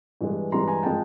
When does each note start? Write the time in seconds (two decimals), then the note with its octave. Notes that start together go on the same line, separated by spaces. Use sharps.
0.21 G2 E3 G#3
0.52 G2 E3 G#3 A#5 C6
0.68 G#5 A#5
0.83 F3 G#3 G5 A5